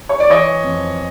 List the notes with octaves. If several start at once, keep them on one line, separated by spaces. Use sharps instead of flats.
C#5
D5
E3 C#5 D#5
F2